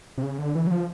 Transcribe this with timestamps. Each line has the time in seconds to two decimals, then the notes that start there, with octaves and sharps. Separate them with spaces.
0.18 C3
0.23 C#3
0.39 D3
0.55 E3
0.67 F#3
0.71 F3